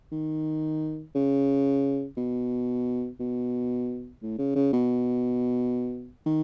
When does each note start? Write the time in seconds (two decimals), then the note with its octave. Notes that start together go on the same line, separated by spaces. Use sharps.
0.12 D#3
1.15 C#3
2.17 B2
3.20 B2
4.22 A2
4.38 C#3
4.56 C#3
4.73 B2
6.26 D#3